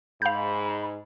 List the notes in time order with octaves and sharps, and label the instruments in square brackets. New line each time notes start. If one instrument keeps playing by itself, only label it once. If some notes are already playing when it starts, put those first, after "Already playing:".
[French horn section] G#2 [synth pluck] F5 G6 [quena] B5